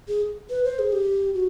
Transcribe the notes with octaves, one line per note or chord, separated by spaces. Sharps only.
G#4
B4
C5
G#4
G4
F#4